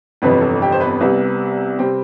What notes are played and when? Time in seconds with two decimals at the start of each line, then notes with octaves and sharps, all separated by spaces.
0.22 G1 F2 C3 E3 B3 B4
0.41 A4
0.62 G4
0.72 C5
0.80 B3 B4
1.01 C2 C3 G3 B3
1.79 C3 G3 C4